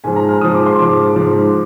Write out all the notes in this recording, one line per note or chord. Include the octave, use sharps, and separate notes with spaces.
G#2 F3 G#5
A#5
F6
G#2 F3 D#6
D6
C6
G#2 F3 D6
G#2 F3